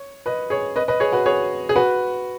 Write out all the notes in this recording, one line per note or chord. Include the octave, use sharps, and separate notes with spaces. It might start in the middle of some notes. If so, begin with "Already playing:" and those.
Already playing: C#5
B4 D#5
G#4 C#5
B4 D#5
B4 D#5
G#4 C#5
F#4 B4
G#4 C#5
G#4
F#4 B4